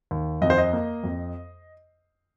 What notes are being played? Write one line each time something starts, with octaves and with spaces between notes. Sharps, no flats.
D#2
F2 D#5
C5
D#5
A#3
F2